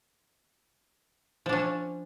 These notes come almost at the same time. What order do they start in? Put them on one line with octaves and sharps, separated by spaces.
F3 D4 C#4